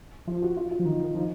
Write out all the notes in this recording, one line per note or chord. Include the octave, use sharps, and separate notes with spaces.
F3 F4
F#4
F4
F4
F3
D#3 D#4
D#3
F3 D#4